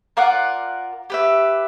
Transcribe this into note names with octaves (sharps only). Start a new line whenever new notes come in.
F4 A#4 D5 F#5
G4 B4 E5